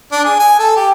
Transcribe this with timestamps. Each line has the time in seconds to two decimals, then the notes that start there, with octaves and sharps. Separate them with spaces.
0.12 D4
0.24 G#4
0.39 G#5
0.59 A4
0.76 G4